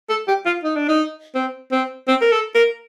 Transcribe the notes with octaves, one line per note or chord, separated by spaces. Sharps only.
A4
G4
F4
D#4
D4
D#4
C4
C4
C4
A#4
A4
A#4